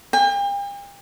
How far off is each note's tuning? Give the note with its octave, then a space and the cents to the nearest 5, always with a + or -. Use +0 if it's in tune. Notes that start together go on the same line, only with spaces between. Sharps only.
G5 +45